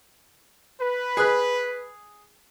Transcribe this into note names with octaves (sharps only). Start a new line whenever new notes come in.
B4
G#4 F#6